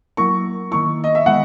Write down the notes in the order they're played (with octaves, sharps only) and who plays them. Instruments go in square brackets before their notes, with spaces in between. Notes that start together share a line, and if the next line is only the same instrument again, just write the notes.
[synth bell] F#3 A#3 E4 A#4 [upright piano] C#6
[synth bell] D#3 A#3 E4 [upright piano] C#6
[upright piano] D#5
E5
[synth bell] D#3 G#3 B3 [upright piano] F#5